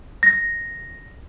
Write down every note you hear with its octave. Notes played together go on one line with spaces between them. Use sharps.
A#6